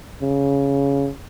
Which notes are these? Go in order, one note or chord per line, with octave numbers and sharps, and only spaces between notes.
C#3